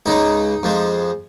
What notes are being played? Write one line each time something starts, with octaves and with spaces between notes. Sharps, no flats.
C#2 C#3 G#3 D#4
F2 F3 G#3